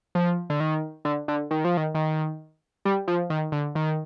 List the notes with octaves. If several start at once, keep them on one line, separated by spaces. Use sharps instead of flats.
F3
D3
D#3
D3
D3
D#3
F3
D#3
D#3
G3
F3
D#3
D3
D#3